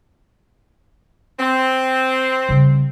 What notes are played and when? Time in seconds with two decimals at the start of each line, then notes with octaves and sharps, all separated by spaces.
1.39 C4
2.49 C#3 G3